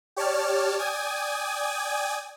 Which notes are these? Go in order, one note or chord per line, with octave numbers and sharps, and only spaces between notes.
G4 C#5 D5 A5 F6
D5 G5 G#5 D#6 G#6